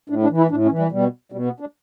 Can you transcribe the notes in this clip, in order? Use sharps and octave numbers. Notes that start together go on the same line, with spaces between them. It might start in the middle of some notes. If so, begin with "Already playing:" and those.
A2 D4
D4
E3
E4
A2 D4
C#4
E3
G3
B2 G3
B2 G3
B3
D4